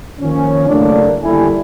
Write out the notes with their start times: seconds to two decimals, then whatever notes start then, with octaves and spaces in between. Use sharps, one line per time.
0.21 D#3 F3 A#3 C#4
0.68 F#1 A2 A3 A#3 D4
1.22 G1 D#2 G3 E4 A4 G#5